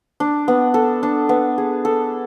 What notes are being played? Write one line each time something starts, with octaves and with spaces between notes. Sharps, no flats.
D4
B3
A4
D4
B3
G#4
A4